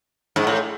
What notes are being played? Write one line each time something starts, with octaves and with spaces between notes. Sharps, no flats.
G#2
A2